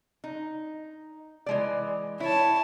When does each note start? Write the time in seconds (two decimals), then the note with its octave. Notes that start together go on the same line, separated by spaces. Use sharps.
0.24 D#4
1.46 E3 G#3 D5
2.20 E4 C#5 A5